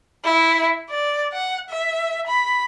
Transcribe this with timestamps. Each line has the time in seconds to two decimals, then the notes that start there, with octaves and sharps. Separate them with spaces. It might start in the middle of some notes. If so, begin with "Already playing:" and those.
0.24 E4
0.89 D5
1.33 F#5
1.69 E5
2.27 B5